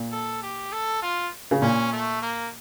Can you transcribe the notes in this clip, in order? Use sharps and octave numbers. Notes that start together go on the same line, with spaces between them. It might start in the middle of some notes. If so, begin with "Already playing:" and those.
Already playing: A#2
A4
G4
A4
F4
C#3
A#2 C#4
A3
A#3